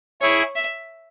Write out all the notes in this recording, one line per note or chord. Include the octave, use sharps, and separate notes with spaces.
E4 G#4 C#5
E5